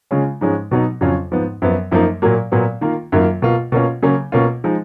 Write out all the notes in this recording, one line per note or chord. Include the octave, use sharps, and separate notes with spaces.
C#3 G#3 C#4 F4
G#2 F3 G#3 C#4
B2 F#3 B3 D#4
F2 C#3 F#3 C#4 F4
G#2 F3 B3
F#2 F3 B3
F#2 F3 A#3 D#4
A#2 F#3 A#3
A#2 F#3 B3
D#3 A#3 F4
F#2 D#3 F#3 A#3 F4
B2 A#3 F4
B2 A#3 C#4 F4
C#3 F#3 A#3 C#4
B2 A#3 C#4 F4
F3 G#3 D#4